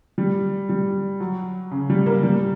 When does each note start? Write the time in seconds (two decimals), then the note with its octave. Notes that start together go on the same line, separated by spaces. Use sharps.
0.18 G3
0.69 G3
1.20 F#3
1.71 C#3
1.90 G3
2.06 A#3
2.23 G3